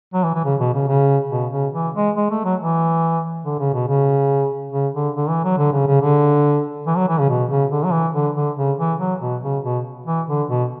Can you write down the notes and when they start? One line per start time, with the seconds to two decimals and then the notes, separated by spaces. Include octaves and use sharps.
0.14 F#3
0.24 E3
0.34 E3
0.45 C#3
0.60 B2
0.74 C#3
0.88 C#3
1.31 B2
1.52 C#3
1.74 E3
1.96 G#3
2.17 G#3
2.31 A3
2.45 F#3
2.60 E3
3.45 D3
3.59 C#3
3.74 B2
3.88 C#3
4.73 C#3
4.94 D3
5.16 D3
5.29 E3
5.44 F#3
5.58 D3
5.73 C#3
5.87 C#3
6.01 D3
6.87 E3
6.97 F#3
7.08 E3
7.19 C#3
7.29 B2
7.50 C#3
7.71 D3
7.85 F#3
7.93 E3
8.14 D3
8.35 D3
8.57 C#3
8.79 E3
8.99 F#3
9.21 B2
9.43 C#3
9.64 B2
10.06 E3
10.28 D3
10.49 B2